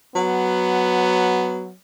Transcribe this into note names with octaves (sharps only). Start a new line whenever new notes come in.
F#3 B3